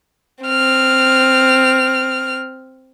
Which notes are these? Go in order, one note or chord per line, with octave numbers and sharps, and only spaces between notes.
C4 F6